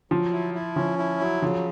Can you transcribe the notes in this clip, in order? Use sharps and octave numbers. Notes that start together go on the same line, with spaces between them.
F3 F#3
E4
E4
F3 C#4
E4
F#3
C#3 F3